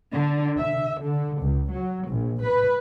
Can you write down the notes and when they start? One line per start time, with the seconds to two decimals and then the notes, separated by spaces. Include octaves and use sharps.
0.11 D3
0.58 E5
1.00 D3
1.40 C#2
1.71 F#3
2.07 A#1
2.42 B4